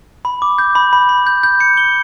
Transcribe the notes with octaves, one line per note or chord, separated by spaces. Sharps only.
B5
D6
G6
B5
B5
B5
G6
G6
C#7
G7